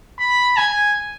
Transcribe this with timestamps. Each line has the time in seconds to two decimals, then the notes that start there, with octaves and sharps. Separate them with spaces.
0.20 B5
0.57 G#5